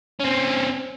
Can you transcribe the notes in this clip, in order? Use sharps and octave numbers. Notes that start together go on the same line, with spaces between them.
C4 C#4